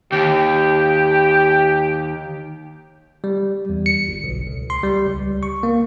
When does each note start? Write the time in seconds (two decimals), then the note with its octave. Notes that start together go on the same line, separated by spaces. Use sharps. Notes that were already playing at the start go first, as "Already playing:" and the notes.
0.12 D#2 G4
3.24 G3
3.69 E2
3.86 C#7
4.08 G1
4.24 B1
4.47 C#2
4.70 C6
4.83 G3
5.07 C#2
5.43 C#6
5.63 A#3